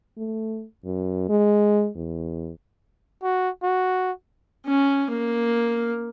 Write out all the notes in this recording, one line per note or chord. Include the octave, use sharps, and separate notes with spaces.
A3
F#2
G#3
E2
F#4
F#4
C#4
A#3